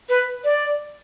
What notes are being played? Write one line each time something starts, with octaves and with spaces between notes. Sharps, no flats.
B4
D5